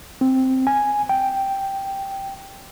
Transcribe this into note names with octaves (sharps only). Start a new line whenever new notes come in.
C4
G#5
G5